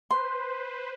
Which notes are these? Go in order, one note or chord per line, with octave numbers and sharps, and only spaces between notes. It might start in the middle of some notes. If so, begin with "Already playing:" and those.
B4 C5 C6